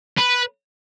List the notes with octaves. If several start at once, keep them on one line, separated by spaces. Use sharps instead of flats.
B4